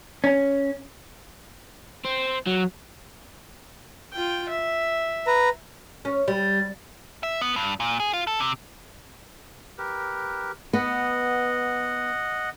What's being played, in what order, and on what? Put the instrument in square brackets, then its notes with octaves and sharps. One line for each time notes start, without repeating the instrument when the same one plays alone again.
[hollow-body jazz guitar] C#4
[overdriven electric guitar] C4
F#3
[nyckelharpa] F4 G5
E5
[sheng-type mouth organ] B4 A#5
[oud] C#4
G3
[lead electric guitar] E5
B3
G2
A#2
G#4
F4
A4
C3
[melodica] G4 A#4 B4
[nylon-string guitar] B3 [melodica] D#5 F#5